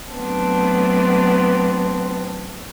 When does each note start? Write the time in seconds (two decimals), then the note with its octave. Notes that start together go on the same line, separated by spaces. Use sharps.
0.12 F#3 A3 B3 C4 D4